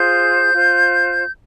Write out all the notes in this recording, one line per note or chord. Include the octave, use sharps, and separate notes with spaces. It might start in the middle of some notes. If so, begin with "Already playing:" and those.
Already playing: F4 G#4 C5 G6
F4 C5